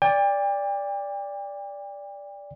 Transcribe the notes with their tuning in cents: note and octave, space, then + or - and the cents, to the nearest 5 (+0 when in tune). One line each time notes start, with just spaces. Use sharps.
D5 -10 G5 +40